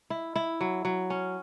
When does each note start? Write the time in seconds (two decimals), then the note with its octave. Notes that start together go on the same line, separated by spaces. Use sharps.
0.10 E4
0.36 E4
0.61 F#3
0.85 F#3
1.10 C#4